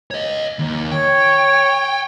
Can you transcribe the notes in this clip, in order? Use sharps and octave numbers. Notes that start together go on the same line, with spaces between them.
C#5 D#5
D#2
C#5 G5